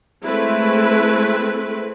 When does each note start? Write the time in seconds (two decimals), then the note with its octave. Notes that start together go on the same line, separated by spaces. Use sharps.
0.24 G#3 A3 C4 E4 B4